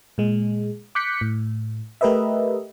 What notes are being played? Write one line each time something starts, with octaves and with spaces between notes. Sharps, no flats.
A#2 G#3
D6 F#6 G6 B6 C#7
A2
A3 G4 A#4 B4 D#5 E5